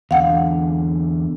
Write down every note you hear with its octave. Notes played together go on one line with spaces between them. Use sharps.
E2 D3 F5 F#5